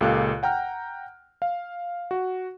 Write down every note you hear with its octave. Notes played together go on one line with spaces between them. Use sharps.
C#2 A#2 G4 A4 F5 F#6
F#5 G5 A#5 F6
F5
F#4